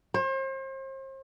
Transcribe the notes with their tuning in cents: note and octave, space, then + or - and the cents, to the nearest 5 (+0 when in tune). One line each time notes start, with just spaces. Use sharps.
C5 +40